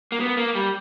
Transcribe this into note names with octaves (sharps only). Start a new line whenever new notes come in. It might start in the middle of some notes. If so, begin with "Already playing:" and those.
A#3
B3
A#3
G3